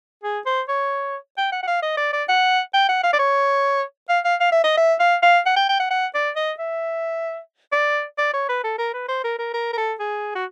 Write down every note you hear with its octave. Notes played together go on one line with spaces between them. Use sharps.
G#4
C5
C#5
G5
F#5
F#5
F5
D#5
D5
D5
F#5
G5
F#5
F5
D5
C#5
F5
F5
F5
E5
D#5
E5
F5
F5
F#5
G5
G5
F#5
F#5
D5
D#5
E5
D5
D5
C#5
B4
A4
A#4
B4
C5
A#4
A#4
A#4
A#4
A4
G#4
F#4